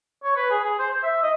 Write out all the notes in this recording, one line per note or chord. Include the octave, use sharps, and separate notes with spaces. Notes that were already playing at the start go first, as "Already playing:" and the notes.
C#5
B4
G#4
G#4
C5
C5
E5
D#5